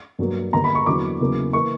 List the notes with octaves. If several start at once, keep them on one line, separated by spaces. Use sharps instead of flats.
G2 F#3 A#3
G2 D3 G3 A#3 A#5
B5
C#6
E2 D3 F#3 A#3 D6
E2 C#3 F#3 A#3
E3 A#3 C#6